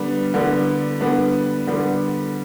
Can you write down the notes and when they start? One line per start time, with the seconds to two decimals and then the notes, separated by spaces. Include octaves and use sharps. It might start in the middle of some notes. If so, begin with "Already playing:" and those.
Already playing: D3 G3 B3 D4
0.34 D3 G3 B3 D4
1.01 D3 G3 B3 D4
1.67 D3 G3 B3 D4